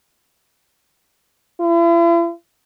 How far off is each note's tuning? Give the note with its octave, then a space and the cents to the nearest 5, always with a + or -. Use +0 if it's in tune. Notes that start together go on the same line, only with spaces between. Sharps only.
E4 +45